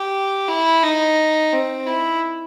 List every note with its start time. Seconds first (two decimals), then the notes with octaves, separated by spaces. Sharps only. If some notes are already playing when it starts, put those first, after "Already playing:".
Already playing: G4
0.48 E4
0.83 D#4
1.52 C4
1.87 E4